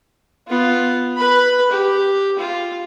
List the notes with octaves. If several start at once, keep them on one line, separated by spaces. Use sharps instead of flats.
B3 F4
B4 B5
G4
F4